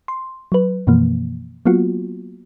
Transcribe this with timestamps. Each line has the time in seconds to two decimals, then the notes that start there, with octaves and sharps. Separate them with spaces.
0.08 C6
0.52 F#3 B4
0.87 F#2 B2 E3 F3 A#3
1.66 F#3 A#3 B3 F4 F#4